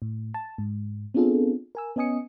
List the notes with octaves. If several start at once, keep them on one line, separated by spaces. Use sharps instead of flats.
A2
A5
G#2
B3 C4 D4 F4 G#4 A4
A#4 G#5 E6
B3 C#4 D#5 G#5 D#6 C#7